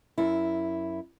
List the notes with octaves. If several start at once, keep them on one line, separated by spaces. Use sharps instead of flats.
F#2 E4